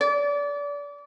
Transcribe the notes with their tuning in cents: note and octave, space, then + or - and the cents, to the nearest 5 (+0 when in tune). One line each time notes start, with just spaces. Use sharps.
D5 -30